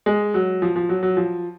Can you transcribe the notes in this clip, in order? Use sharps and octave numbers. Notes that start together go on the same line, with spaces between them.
G#3
F#3
F3
F3
F#3
F#3
F3